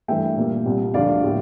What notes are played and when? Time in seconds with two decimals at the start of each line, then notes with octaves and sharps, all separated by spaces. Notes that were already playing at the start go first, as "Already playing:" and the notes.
0.08 G2 E3 A3 E5 G5
0.37 A#2 G3 A#3
0.66 C2 A#2 G3
0.94 D2 D3 F3 D5 F5
1.24 A2 G3 A#3